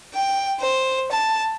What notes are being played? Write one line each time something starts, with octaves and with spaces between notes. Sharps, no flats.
G5
C5
A5